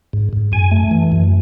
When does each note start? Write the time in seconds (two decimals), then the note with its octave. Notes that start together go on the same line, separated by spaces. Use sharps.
0.13 G#2
0.33 G#2
0.52 F#2 G#5
0.72 A3
0.91 E3
1.12 F#2